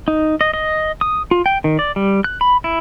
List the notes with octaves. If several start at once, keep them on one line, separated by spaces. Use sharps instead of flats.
D#4
D#5
D#5
D#6
F4
G5
D#3
D5
G3
F#6
B5
E4